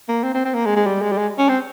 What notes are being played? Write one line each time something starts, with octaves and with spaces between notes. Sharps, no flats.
A#3
C4
C4
C4
A#3
G#3
G#3
G3
G#3
G3
G#3
C#4
C4